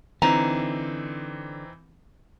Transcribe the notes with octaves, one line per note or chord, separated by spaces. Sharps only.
D3 E3 C4 D#4 A#5